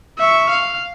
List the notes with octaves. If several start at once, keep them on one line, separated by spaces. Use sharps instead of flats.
E5 C#6
F5